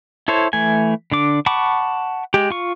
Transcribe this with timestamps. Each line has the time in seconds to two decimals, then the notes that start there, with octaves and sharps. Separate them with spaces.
0.28 E4 A4 C5 C#5
0.53 E3 A3 G#5
1.12 D3 D4 D6
1.46 F#5 A5 B5 C#6 D6
2.34 G#3 G4
2.50 F4 C#6